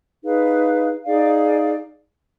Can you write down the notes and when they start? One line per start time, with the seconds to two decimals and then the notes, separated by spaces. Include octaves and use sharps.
0.22 D#4 G#4 B4 F5
1.05 D#4 G#4 D5 F5